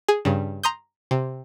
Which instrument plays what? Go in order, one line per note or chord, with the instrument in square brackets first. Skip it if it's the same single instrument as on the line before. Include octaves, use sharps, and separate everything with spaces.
[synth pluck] G#4
G2 C#3
A#5 C6 D#6 G6
C3